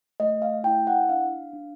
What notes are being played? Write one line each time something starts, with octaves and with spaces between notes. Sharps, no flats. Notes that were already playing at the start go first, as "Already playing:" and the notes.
A3 D#5
F5
E4 G5
F#5
D4 F5
D4